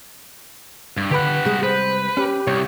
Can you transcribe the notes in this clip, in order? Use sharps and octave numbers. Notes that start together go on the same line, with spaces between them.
G2
D3 G4 B4 F#5 B5
C3 G3 G#3 G#4
B4 C5
C#4 G4
C2 C#5